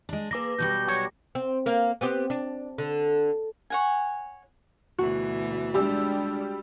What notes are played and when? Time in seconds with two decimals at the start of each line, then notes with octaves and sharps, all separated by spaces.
0.09 G#3 D4
0.31 A#3 G#4 B4 D6 A#6
0.58 B2 F#3 G3 G6
0.87 B1 F#4 C#5
1.35 C4
1.66 A#3 A#4
2.01 B3 C4 G4
2.30 D4
2.78 D3
3.70 C#5 F#5 G#5
4.99 D2 B2 E3 F#4
5.74 G3 G#3 D4 G4 E6